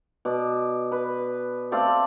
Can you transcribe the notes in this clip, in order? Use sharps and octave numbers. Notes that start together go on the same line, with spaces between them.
B2 D5
B4
A3 C4 D5 F5